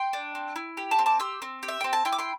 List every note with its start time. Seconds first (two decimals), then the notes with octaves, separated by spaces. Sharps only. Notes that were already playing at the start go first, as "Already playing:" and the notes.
Already playing: G5 C6
0.13 D4
0.35 C4
0.56 E4
0.77 G4
0.91 A5 D6
0.99 C4
1.06 A5 D6
1.20 G4 C6 E6
1.42 C4
1.63 G4
1.68 E5
1.81 C4 G5
1.93 A5
2.05 E4 G5 C6
2.12 D6
2.18 G5 C6